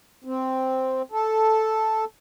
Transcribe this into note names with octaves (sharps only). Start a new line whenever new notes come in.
C4
A4